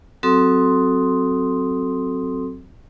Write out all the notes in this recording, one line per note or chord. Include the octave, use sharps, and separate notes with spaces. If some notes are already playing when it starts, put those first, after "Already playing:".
F#3 C4 F#4 A4 C6 D#6